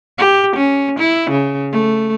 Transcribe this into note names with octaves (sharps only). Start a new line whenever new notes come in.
G4
C#4
E4
C#3
A3